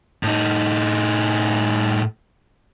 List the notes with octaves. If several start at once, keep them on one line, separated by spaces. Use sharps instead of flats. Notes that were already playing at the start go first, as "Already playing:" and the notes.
A2 D#4